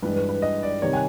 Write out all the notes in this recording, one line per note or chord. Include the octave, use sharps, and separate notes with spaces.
G2 E3 G#3 B4
B4
B4
D#5
D5
C3 D#3 G3 C#5
G#5